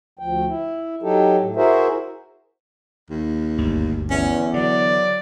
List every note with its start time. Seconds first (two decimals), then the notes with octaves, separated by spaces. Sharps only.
0.19 D2 F3 G5
0.47 E4
1.03 F#3 D#4 G4 A4
1.40 A2
1.56 E4 F#4 G#4 A#4 C5 E5
3.10 D#2
3.58 G1 D2
4.10 E2 C#4
4.54 D3 F#3 D5